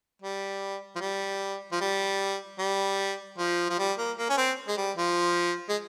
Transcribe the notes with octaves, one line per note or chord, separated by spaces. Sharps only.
G3
F3
G3
F3
G3
G3
F3
F3
G3
A#3
A#3
C#4
C4
G#3
G3
F3
G#3